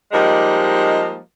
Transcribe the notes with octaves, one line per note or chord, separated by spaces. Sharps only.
F3 G3 G#3 A#3 D#4